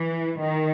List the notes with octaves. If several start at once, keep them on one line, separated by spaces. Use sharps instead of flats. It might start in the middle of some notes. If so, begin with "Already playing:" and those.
Already playing: E3
D#3